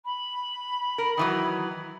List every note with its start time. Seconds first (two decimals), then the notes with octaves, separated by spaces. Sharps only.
0.05 B5
0.98 A#4
1.17 D#3 E3 F#3